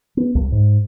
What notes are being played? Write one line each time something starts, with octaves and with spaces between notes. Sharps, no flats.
B3
C2
G#2